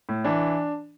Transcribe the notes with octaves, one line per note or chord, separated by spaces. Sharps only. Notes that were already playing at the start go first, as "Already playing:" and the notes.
A2
E3 D4